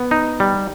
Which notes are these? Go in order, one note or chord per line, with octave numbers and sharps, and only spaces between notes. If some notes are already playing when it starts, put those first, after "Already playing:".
Already playing: B3
D#4
G3